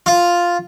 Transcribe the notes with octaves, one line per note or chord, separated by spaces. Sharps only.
F4